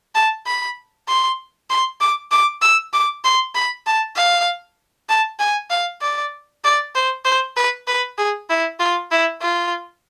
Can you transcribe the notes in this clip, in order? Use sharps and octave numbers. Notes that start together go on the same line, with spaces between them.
A5
B5
C6
C6
D6
D6
E6
D6
C6
B5
A5
F5
A5
G#5
F5
D5
D5
C5
C5
B4
B4
G#4
E4
F4
E4
F4